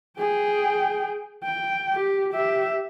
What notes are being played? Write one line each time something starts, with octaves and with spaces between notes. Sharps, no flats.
G#4 G5
G5
G4
G4 E5